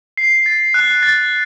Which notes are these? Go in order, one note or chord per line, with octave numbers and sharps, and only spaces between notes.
C7
A6
F#6
A6